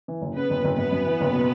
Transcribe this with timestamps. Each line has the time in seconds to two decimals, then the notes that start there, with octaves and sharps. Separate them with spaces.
0.08 E3
0.21 F#1
0.35 C#3 B3 B4
0.50 F#1
0.64 F#1
0.77 F#2 B3 B4
0.91 F#2
1.06 E3
1.20 F#1
1.34 B2